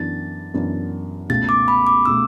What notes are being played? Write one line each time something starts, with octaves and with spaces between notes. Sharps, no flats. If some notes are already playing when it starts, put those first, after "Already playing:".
Already playing: F#2 E3 B3 D4 A6
F#2 E3 B3 D4
C#2 B2 A3 A6
D6
B5
D6
B2 A3 E6